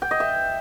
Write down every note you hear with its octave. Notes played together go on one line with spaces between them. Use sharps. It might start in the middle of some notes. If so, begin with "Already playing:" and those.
G5
D#5
E5